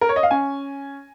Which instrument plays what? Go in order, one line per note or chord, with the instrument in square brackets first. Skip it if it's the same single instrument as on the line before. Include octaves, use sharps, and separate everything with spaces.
[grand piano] A#4
C#5
D#5
F5
C#4 G#5